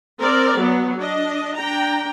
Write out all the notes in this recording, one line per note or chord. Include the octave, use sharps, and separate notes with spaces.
C4 A#4 D5
F#3 B3
D4 D#5
D4 G5 A#5